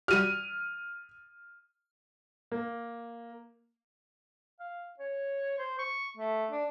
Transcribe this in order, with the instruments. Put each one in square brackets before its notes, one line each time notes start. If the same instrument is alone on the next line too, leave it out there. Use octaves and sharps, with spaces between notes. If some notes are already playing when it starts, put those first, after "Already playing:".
[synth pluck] G3 F#4 G4 [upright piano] F6 D#7
[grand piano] A#3
[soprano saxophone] F5
C#5
C5
C#6
A3
D4